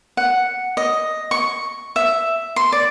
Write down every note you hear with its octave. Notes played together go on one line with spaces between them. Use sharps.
F#5
D#5
C#6
E5
C6
D5